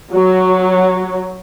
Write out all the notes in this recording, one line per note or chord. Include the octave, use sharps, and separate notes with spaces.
F#3